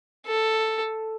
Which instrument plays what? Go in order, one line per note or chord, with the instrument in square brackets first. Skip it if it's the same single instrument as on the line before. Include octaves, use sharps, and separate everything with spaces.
[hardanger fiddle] A4